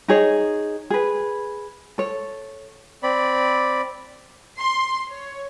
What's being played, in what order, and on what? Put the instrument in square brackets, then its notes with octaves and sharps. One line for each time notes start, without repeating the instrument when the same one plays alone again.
[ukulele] D#4 G#4 C#5
G#4 B4
A4 C#5
[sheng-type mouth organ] C4 D5 B5
[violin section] C6
C#5